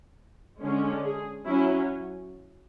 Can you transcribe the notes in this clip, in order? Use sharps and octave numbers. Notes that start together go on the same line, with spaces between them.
D3 G#3 C#4
G#4
F#3 C#4 E4